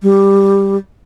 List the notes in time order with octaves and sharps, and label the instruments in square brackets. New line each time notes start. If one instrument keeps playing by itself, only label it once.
[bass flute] G3